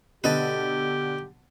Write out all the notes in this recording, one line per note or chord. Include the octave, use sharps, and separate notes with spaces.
B2 D3 G4 B4 D#5 A5